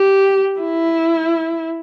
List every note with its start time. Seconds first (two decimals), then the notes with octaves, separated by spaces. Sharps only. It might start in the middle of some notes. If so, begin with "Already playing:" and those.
Already playing: G4
0.61 E4